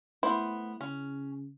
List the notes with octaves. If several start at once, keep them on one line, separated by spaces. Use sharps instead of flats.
A3 B3 E4 C5
C#3 C#4